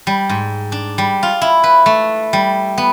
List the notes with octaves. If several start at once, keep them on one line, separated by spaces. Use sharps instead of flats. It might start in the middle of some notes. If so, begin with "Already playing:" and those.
G3
G#2
D4
G3
F4
E4
B4
A3
G3
B3